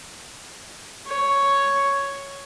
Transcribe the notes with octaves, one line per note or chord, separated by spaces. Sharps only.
C#5